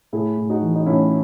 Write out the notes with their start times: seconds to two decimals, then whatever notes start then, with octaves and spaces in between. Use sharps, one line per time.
0.13 A2 E4 G#4
0.37 A2
0.50 D#4 F#4
0.62 E3
0.75 D#4
0.86 A2 C#4 E4